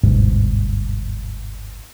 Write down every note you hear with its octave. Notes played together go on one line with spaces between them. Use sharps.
G1 D2 G#2 B2